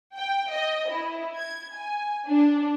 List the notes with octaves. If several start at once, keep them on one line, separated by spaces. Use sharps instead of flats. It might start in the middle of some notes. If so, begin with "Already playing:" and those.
G5
D#5
E4
G#6
G#5
D4